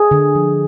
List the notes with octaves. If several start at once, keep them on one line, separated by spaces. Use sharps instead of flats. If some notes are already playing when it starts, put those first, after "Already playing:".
Already playing: G#4
D3
F3